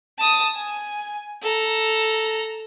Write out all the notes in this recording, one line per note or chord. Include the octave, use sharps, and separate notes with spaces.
A5 D#6
G#5
A4 A#5